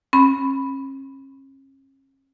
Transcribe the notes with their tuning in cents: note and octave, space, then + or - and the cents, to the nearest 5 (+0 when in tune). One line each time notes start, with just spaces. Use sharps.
C#4 -40 B5 +0